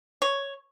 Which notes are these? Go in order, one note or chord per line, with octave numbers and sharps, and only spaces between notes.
C#5